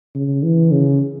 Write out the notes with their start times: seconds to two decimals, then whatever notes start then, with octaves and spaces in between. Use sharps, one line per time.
0.15 C#3
0.43 E3
0.72 C#3